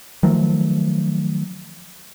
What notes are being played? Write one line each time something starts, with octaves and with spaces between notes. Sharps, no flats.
D#3 F3 F#3 A3